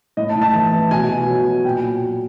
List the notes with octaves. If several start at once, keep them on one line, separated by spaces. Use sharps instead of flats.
A2 D#5
A5
A2
A5
E3
E3
B2 G#5
B2
F#3
F#3
A#2 G5
A#2
F#3